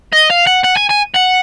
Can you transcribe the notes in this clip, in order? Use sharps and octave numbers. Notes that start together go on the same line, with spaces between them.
D#5
F5
F#5
F#5
G#5
G#5
F#5